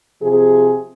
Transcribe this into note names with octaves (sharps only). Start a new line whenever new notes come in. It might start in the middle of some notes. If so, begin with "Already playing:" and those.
C3 F3 G#4